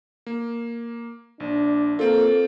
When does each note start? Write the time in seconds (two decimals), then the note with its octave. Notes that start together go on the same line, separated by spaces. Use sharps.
0.27 A#3
1.40 A#1 D4
1.99 A#3 C4 F4 A4